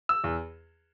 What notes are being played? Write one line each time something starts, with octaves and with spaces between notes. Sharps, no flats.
E6
E2